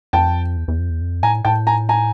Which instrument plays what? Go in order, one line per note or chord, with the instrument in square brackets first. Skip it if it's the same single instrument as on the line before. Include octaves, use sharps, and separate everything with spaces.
[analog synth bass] F2 [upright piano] G5 A5
[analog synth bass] E2
E2
F2
E2
F2
[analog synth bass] A2 [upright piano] G#5 A#5
[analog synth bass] A2 [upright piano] G5 A5
[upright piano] G#5 A#5
G#5 A#5